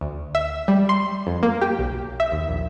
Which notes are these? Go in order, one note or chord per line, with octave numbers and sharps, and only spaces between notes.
D2
E5
G3
C6
F2
A#3
G4
B1
E5
D#2
A#1